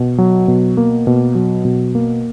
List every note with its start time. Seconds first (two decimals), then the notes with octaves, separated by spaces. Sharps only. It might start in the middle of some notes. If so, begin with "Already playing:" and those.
Already playing: B2
0.18 F#3
0.48 B2
0.77 A#3
1.07 B2
1.35 F#3
1.65 B2
1.95 A#3